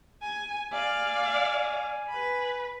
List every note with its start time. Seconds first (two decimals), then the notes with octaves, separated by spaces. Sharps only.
0.22 G#5
0.72 D5 F5 G#5
2.10 B4 B5